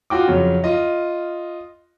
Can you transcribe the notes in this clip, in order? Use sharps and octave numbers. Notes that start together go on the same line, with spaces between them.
F4 F#4 G5 D6
F2 C#3 F#3
F4 D#5